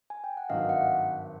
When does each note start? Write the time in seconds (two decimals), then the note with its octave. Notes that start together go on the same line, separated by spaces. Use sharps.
0.10 G#5
0.24 G5
0.37 F#5
0.49 G#1 G2 D#3 F#3 D#5 F5
0.69 E5 F#5